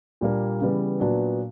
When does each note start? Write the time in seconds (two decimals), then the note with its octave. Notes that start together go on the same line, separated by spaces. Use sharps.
0.21 A#2 G3 A#3 D4
0.61 C#3 E3 G3 B3
1.00 A#2 F#3 B3 D4